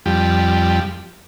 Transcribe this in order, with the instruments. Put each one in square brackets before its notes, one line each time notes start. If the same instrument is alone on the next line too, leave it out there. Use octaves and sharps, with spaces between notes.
[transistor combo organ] F2 G3